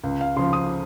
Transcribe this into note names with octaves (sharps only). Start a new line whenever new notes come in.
C#2
F5
C#3 F3 C6
D#6